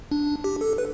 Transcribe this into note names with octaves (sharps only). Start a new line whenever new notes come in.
D4
G4
A4
B4